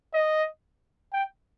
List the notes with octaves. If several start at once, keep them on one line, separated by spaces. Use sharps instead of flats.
D#5
G5